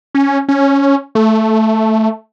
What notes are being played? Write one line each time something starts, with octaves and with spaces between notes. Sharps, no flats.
C#4
C#4
A3